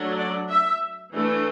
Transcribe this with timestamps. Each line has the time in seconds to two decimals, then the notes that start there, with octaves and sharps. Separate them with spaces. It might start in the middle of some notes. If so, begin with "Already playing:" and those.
Already playing: F#3 A3 D4
0.17 D5
0.50 E5
1.13 E3 A3 D4